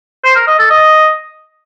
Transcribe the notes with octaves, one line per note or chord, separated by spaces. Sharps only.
C5
A#4
D#5
A4
D#5